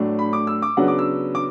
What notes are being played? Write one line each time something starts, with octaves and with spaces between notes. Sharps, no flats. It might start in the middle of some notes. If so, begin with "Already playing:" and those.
Already playing: A2 F#3 A3 D4
B5
D6
E6
D6
C#3 F#3 B3 D4 F#5
D6
E6
D6